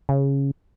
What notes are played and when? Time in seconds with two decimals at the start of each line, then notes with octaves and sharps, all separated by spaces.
0.09 C#3